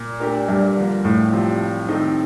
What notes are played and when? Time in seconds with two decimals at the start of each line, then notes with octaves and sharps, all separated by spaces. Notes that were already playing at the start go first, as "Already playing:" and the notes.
Already playing: A#2
0.20 A3 D4 G4 A#4
0.48 G2
0.77 D3 F3 A#3
1.05 A2
1.32 C3 F3 C4 F4
1.88 D#3 A3 C4 D#4